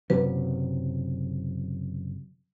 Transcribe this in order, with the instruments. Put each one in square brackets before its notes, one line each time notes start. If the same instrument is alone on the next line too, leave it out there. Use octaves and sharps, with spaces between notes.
[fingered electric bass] F#1 C3 F#3 [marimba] B4